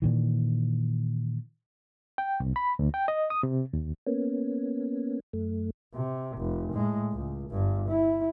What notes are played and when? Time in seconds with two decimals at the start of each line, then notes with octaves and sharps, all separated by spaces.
0.02 A#2 D#3 E3
2.18 G5
2.40 C2
2.56 B5
2.79 D2
2.94 G5
3.08 D#5
3.30 D#6
3.43 C3
3.73 D#2
4.07 A#3 B3 C#4
5.33 F#2 A3
5.94 C3
6.38 F1
6.73 A2 G#3
7.12 C#2
7.51 G1 G2
7.90 E4